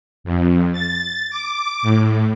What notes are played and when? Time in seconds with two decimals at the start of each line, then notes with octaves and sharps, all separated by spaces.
0.24 F2
0.73 A6
1.30 D6
1.82 A2